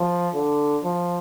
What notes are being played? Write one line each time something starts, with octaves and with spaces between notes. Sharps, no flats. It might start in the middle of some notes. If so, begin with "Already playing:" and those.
Already playing: F3
D3
F3